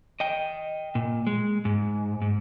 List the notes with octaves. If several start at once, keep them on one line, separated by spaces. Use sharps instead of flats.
D#5 G5
A#2
G#3
G#2
G#2